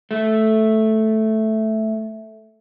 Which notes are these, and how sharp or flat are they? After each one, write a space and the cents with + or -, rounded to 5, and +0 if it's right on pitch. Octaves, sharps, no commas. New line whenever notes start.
A3 -5